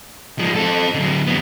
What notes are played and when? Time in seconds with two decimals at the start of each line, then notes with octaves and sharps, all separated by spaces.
0.39 F3 G#3
0.56 C4 A4
0.94 D3 F#3
1.27 F2 B3